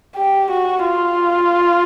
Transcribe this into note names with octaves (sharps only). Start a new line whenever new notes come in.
G4
F#4
F4